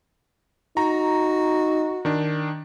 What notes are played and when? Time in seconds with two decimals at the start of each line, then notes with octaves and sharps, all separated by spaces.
0.77 D#4 F#4 A#5
2.05 D#3 D4